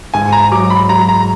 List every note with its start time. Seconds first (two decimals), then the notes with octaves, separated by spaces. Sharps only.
0.14 G#2 G#5
0.32 A#5
0.52 F#3 D6
0.70 B5
0.89 F#3 A#5
1.09 A#5